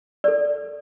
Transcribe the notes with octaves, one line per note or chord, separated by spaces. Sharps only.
A4 D5